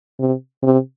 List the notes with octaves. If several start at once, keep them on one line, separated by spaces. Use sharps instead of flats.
C3
C3